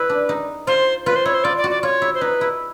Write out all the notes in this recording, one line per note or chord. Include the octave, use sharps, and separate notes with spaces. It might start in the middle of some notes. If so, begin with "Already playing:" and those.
Already playing: E4 B4
D4
D#4
F4 C5
F4 B4
C5
E4 C#5
C5
F4 D5
D5
F#4
D5
F4 C#5
E4
C5
D#4 B4
E4